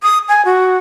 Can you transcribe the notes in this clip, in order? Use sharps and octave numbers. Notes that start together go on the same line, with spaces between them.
D#6
G#5
F#4